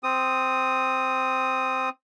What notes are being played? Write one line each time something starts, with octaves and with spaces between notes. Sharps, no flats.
C4 D#6